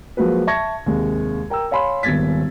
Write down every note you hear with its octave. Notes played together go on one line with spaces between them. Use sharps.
F3 F#3 G#3 A#3 F#4 B4
E5 A5 C#6 G#6 A#6 C#7
D#2 C3 G#3
A#4 G5 A#5 E6
C#5 F5 G#5 B5 C6
D#1 G#1 B3 G#6 A6 B6